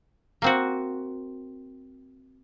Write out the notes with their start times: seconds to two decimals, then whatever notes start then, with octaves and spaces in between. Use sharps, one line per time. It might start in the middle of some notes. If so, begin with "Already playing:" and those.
0.42 A#3 C4 F#4